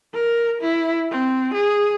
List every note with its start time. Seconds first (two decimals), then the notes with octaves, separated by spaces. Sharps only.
0.15 A#4
0.62 E4
1.11 C4
1.54 G#4